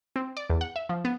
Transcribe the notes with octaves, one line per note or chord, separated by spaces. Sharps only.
C4
D5
E2
F#5
E5
F3
B3